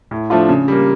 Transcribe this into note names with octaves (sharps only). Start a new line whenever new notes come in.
A2
F3 A3 D4 F4
C#3
G3 A#3